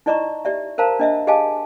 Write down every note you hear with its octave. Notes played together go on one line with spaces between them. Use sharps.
D#4 E4 D5 D#5 A#5 C#6
G4 D5 E5
A#4 C5 F5 A5 A#5
D4 D#5 E5
G4 G#4 D#5 F5 G#5 A5